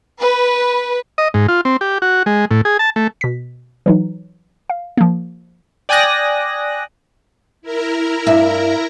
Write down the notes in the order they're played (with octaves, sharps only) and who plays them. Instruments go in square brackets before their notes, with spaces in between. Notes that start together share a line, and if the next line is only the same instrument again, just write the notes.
[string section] B4
[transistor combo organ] D#5
G#2
F4
C4
G4
F#4
G#3
A2
G#4
A5
A3
[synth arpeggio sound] B2 B6
E3 F#3 D#4
F5
F3 A#3
[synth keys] D5 G5 G#5 D#6 F#6 A#6
[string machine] E4 A#4 A#5
[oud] G2 E5